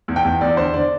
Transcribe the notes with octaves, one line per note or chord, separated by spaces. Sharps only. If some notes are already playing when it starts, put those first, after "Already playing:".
E2
G5
E2
E2 D5
D3 C5
D3 D5